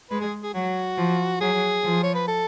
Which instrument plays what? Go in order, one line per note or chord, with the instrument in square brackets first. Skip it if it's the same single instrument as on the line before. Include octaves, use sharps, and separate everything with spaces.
[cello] G#3 [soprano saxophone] B4
[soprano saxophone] G#4
G#4
[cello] F#3 [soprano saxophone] F#4
[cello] F3
[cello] F#3 [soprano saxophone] G#4
[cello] F3
[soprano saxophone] C#5
B4
A4